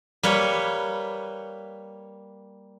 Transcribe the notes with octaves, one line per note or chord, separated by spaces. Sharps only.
G3 A#3 B4 C#5